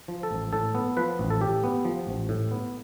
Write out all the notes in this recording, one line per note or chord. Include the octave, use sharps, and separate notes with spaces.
F3
A4
A1
A2 A4
B3
F3 B4
A1
A4
A2 G4
B3
F3
A1
A2
B3